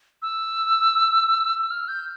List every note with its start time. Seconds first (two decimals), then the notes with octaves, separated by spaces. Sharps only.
0.22 E6
1.61 E6
1.70 F6
1.88 G6